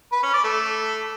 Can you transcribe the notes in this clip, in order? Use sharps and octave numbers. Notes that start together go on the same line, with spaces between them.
B4
C#4
D5
A3